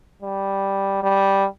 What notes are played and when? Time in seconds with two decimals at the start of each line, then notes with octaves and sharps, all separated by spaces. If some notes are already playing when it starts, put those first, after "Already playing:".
0.22 G3
1.03 G3